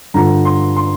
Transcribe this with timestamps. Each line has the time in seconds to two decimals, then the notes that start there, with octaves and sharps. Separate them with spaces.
0.14 G2 D3 F3 A#5
0.45 C6
0.77 C6